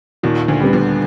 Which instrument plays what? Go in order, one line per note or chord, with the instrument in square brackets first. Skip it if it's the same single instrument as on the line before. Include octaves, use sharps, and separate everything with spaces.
[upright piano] D#2 D#3 [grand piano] A#2
[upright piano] D2 D3
[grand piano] G3 B3
[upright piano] D2 D3